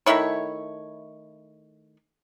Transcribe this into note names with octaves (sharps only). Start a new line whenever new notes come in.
D#3 A3 E4 C#5